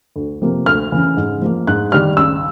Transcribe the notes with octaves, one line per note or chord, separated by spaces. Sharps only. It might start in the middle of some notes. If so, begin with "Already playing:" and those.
D2
C3 F3 A#3
D2 F6
C#3 E3
G#2
F3 A#3
G#2 F#6
D#3 G3 F6
C#2 E6